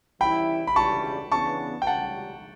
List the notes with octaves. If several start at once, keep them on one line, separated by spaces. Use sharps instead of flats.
E3 G3 C#4 E4 G5 B5
B5
C#2 C#3 E3 G3 D4 A5 C#6
C#3 E3 B3 D4 A5 C#6
G5
C#2 C#3 G3 F#5 A5